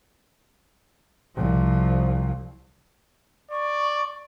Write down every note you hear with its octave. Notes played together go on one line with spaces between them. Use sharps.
C2 F3
D5 C#6